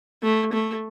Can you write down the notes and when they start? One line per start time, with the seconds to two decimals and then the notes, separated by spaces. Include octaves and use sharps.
0.23 A3
0.53 A3